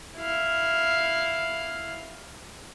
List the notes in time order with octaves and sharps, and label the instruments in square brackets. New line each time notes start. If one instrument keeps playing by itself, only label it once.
[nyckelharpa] E4 F5